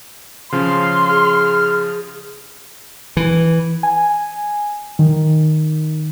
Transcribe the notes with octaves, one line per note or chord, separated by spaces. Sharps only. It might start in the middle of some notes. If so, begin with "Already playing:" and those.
C#3 F3 C#4 F5 C6
G#4 F6
E3
G#5
D#3